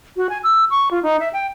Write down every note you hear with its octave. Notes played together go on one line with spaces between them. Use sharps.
F#4
G#5
E6
C#6
F4
D#4
E5
G5